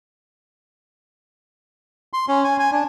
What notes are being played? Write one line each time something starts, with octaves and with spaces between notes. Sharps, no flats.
C6
C#4
G#5
G#5
D4